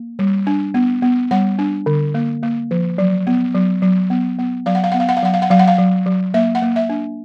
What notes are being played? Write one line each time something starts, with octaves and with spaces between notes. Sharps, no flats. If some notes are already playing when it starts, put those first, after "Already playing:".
Already playing: A#3
G3
D4
B3
B3
G3 F#5
D4
D3
A#3
A#3
F3
F#3
B3
F#3
F#3
B3
B3
F#3 F5
F#5
F5
B3 F#5
F5
F#5
F5
F#3 F#5
F5
F#5
F#3 F5
F#5
F5
F#3
F#3
A#3 E5
F#5
A#3
E5
D4